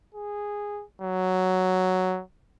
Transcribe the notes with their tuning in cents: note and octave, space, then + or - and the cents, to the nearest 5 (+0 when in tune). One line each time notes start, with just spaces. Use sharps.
G#4 -10
F#3 +5